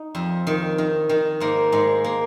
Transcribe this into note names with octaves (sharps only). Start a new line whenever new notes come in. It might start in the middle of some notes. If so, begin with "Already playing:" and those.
Already playing: D#4
F2
D#3
D#3
D#3
G#2 A#3
G#2 G#3
A#3